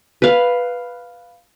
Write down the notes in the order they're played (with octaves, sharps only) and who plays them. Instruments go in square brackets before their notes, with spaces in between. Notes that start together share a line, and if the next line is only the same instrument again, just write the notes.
[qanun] B4 F5